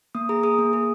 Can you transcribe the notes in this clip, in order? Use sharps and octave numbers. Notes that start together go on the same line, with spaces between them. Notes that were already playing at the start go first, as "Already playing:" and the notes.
A#3 D#6
G#4 A#5
G#4 D#6
A#3
G#4